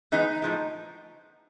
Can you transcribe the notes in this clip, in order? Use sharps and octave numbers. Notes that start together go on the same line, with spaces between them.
E3 G#3 B3 D#4
A2 F3 G#3